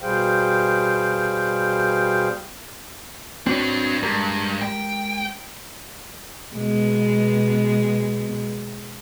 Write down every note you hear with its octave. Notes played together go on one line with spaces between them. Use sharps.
B2 G3 G#4 C5 F5 G5
C4 D4 F#4 B4 C#5
G2 G#3 G4 A#4
G5
B2 G#3 B3